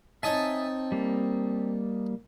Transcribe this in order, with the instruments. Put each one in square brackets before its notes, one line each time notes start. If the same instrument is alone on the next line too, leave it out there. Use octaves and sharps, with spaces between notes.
[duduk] C4 [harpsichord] D#4 C#5 A5 [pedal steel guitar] E5 G#5 D#6
[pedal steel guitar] G3 A#3